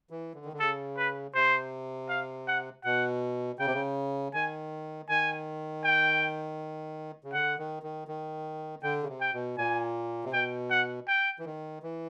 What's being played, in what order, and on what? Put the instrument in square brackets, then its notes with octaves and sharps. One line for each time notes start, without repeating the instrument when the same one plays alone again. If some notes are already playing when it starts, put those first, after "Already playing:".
[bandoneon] E3
D3
D#3
D3
[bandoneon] C#3 [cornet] A4
[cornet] B4
[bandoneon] C3 [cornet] C5
[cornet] F5
F#5
[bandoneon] B2 [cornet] F#5
[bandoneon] C#3 [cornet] G5
[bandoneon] C3
C#3
[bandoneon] D#3 [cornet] G#5
[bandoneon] D#3 [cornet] G#5
[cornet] G5
[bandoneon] C#3
[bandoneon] D3 [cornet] F#5
[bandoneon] D#3
D#3
D#3
[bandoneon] D3 [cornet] G5
[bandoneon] C#3
C3
[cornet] G5
[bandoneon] B2
[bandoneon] A#2 [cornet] G#5
[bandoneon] C3
[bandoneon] B2 [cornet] G5
[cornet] F#5
G5
[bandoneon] E3
D#3
E3